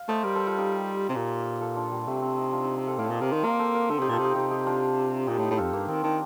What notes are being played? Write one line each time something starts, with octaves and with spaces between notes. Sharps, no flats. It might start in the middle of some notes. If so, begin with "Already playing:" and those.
Already playing: F5
A3 C5 D#5
G3 A#4 D5
A4 C5
F4 A4
D#4 G4
C3
A#2
F4 A4
D4 F4
G3
C3 A3
C4
D#4
D4 F4
D#4
C4
F4 A4
A2 D5 F5
A#2 C5 D#5
C3 A#4 D5
D#3 C5 D#5
A#3 A#4 D5
A4 C5
A#4 D5
D3 A4 C5
C3 D#4 G4
A#2 F4 A4
C3
D#4 G4
C3 D#4 G4
D#4 G4
D4 F4
A#2 D#4 G4
A2
D#4 G4
A2
F2 F4 A4
G2 A#3
D#3 C4
D#3 D4